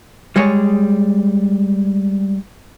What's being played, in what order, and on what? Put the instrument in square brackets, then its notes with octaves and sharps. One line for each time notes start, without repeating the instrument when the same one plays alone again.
[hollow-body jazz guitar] G3 G#3 G#4 C#5